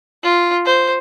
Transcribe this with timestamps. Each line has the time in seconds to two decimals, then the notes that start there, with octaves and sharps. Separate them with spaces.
0.23 F4
0.66 C5